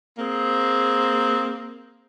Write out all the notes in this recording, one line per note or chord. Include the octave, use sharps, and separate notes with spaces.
A#3 C4 G#4